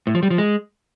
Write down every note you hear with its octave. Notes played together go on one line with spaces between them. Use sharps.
A2
F3
G3
F3
G#3